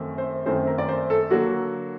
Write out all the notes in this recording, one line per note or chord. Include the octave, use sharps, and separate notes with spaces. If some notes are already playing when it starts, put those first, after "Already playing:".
Already playing: F#2 D#3 A3 C4
C5
F#2 D#3 A3 C4 C5
A#4
D5
C5
A4
D3 F#3 A#3 F#4